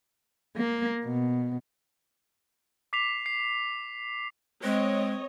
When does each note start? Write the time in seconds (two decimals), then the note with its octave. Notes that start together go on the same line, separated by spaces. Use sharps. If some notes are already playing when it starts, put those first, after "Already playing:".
0.57 A#3
1.05 B2
2.93 D6 B6 C7 F7
3.26 C7
4.63 G#3 C4 C#5 D#5